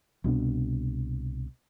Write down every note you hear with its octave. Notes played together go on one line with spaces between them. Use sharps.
C2 B2 B3 D4